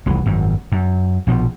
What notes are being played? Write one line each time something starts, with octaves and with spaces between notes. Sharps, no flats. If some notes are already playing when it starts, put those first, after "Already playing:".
F1 C2 E3
G#1 F#2
F#2
A#1 B2 F3